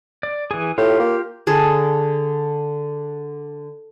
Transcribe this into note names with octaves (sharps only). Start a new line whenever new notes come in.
D5
E3 G#4
A2 F4 G4
A#3
D3 G#4 A5